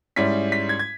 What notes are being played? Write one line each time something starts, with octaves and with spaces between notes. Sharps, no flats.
G#2 G3 C#4 E4 B6
B6
G#6
G#6